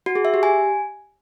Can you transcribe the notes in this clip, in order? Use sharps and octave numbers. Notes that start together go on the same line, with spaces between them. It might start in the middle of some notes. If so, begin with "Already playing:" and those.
F#4
G#4
E5
G4
G#5